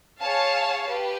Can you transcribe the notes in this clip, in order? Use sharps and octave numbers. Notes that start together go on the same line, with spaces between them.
G#4 C#5 F5 A5
G4 B4